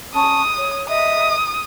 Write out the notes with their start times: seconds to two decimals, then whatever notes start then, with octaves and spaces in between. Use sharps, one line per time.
0.15 C#4 A5 C#6 D#6
0.58 C#5
0.89 D#5 E5 D#6